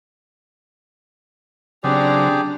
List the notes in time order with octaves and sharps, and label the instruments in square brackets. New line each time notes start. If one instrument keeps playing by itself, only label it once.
[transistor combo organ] C#3 F#3 C4 [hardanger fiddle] D4 A#5 [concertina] G4 G#4 D5